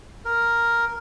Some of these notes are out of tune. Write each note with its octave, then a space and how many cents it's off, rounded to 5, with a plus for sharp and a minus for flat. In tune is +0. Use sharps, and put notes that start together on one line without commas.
A#4 +0